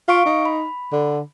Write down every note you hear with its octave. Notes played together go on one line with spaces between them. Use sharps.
F4 F5 C#6 D7
D#4
B5
D3